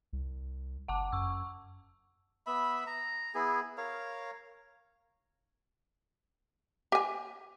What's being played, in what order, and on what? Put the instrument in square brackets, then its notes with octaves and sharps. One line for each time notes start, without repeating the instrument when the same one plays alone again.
[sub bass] C2
[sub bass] F#1 [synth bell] F#5 A5 D6
[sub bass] F#2 [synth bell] C#6 E6
[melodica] B3 E5 B5
A#5
B3 E4 G#4
A#4 C#5 F5
[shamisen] G4 G#5